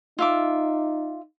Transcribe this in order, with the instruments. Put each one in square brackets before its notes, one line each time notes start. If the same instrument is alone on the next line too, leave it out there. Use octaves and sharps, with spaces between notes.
[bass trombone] D#4 [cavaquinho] F4 E5 D6